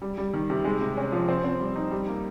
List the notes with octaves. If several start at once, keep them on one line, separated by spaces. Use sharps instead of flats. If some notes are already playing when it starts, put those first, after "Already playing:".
G3
G3
D#3
C3
G#3
C3
C#4
F3
C4
C4
G3
D#4
G3
A#3